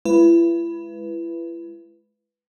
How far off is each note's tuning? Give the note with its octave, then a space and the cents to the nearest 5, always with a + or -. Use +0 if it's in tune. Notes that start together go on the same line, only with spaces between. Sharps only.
G#3 +25 E4 +35 B4 +0